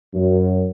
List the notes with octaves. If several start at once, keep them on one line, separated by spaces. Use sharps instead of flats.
F#2